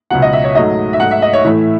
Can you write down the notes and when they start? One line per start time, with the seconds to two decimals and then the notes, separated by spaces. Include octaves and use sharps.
0.10 C#2 B2 F#3 F#5
0.22 D#5
0.33 E5
0.44 C#5
0.55 G#2 F#3 A3 D#5
0.93 E5
1.00 G#2 F#3 A3 F#5
1.11 E5
1.22 D#5
1.33 C#5
1.44 A2 E3 A3 E5